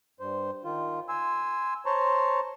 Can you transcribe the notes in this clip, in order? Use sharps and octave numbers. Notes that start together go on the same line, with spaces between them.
G2 C5
D#3 F4
G#5 C6 E6
C5 C#5 A5 A#5 C6 C#6